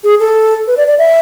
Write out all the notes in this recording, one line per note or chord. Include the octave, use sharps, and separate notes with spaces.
G#4
A4
B4
D5
D5
E5